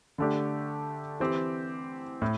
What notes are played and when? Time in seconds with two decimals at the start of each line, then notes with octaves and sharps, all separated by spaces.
0.18 D3 A3 D4 G4
1.20 E3 C4 G4
2.22 A2